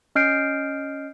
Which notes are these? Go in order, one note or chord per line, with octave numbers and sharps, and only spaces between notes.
C#4 D#5 F6 G6 C7 D7